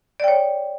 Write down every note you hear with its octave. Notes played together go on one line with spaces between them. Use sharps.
C#5 D5 G5